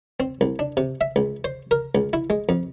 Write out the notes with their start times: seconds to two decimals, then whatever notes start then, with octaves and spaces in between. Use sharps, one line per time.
0.20 C4
0.41 C2
0.59 D4
0.77 C3
1.01 E5
1.16 C#2
1.44 C5
1.71 A#4
1.95 C#2
2.13 E4
2.30 G#3
2.49 F2